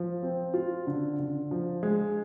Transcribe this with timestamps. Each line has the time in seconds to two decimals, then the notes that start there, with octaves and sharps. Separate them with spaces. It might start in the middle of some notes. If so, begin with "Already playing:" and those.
Already playing: F3
0.23 C4
0.54 F4
0.87 D3
1.19 D3
1.51 F3
1.83 G#3